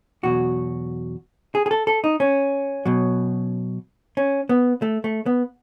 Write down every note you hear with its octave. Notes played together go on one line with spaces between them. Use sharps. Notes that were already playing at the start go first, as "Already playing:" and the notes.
E2 B2 F#3 F#4
G#4
G#4
A4
A4
D#4
C#4
B2 F#3
C#4
B3
A3
A3
B3